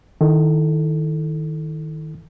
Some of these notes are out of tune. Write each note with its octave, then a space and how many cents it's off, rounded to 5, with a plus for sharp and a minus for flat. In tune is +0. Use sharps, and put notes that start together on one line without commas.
D#3 +0 E4 -5 A4 +0